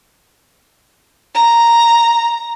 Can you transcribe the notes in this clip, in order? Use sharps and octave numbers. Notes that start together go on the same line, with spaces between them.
A#5